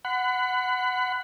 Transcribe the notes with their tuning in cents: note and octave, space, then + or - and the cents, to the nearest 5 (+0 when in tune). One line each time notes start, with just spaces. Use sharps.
F#5 +0 B5 +35